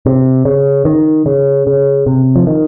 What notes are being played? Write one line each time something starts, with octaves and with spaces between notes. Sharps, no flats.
C3
C#3
D#3
C#3
C#3
C3
F3
D#3